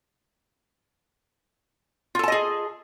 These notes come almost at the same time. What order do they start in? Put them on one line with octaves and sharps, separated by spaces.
F4 A4 A5 D#5 G#4